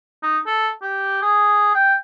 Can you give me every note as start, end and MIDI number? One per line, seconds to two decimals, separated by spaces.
0.23 0.38 63
0.46 0.69 69
0.82 1.20 67
1.22 1.74 68
1.75 1.94 79